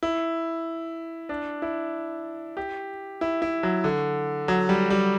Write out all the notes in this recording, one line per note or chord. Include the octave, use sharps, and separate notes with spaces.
E4
D4
E4
G4
E4
E4
F#3
D3
F#3
G3
G3